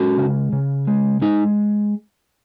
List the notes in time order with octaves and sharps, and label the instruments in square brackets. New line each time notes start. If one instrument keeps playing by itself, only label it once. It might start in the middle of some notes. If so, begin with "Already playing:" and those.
Already playing: [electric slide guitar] G#3 C#4 F#4
C#3
C#3
G#3
G#3 D#4